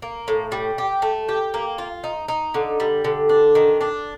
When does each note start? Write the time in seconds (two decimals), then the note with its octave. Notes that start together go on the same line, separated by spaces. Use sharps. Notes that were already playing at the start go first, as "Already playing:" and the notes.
0.02 A#3
0.28 A2
0.52 G3
0.78 G4
1.02 A3
1.29 G4
1.54 A#3
1.78 F4
2.04 D#4
2.28 D#4
2.54 D3
2.80 G3
3.04 D3
3.29 D4
3.55 D#3
3.81 D4